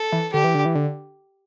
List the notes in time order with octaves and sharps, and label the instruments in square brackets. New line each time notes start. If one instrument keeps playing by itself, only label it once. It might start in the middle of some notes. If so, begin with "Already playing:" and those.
Already playing: [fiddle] A4
[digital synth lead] E3
[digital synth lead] D3 [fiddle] G4
[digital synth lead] E3
D3
E3
D3